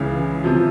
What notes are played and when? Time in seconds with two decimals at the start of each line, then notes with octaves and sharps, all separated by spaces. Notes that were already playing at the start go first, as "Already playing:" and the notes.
Already playing: C#2 C#3 E3 F5
0.44 C3 F3